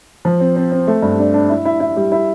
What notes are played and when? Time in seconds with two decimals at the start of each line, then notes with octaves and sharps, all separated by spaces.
0.25 F3
0.40 C4
0.56 C4
0.72 C4
0.87 A3
1.02 G2
1.19 D4
1.34 D4
1.50 E4
1.65 E4
1.80 E4
1.96 G3
2.12 E4